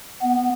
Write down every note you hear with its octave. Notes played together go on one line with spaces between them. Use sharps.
B3